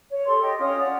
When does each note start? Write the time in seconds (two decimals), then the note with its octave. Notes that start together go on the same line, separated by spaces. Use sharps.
0.10 C#5
0.26 G4 A4 C6
0.41 G4 D#5 G5
0.58 C#4 F4 D#6
0.79 D5 F#5